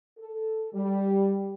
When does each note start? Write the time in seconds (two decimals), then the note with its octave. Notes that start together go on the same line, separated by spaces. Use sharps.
0.18 A4
0.73 G3